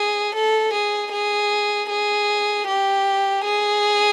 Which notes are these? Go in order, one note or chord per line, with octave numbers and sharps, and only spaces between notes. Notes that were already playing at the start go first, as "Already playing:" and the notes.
Already playing: G#4
A4
G#4
G#4
G#4
G4
G#4